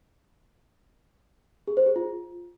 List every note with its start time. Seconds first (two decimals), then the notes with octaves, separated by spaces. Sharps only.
1.67 G#4
1.77 C5
1.86 G#4
1.96 F4